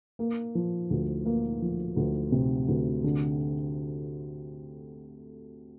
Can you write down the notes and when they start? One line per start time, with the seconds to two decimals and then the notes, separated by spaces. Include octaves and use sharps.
0.19 A#3
0.55 F3
0.90 D2
1.26 A#3
1.62 F3
1.96 D2
2.32 C3
2.68 D2
3.04 D3